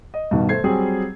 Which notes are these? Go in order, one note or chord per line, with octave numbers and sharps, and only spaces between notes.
D#5
G2 B2 D#3
A3 C5 G#6 C7
F#3 G3 C4 G#4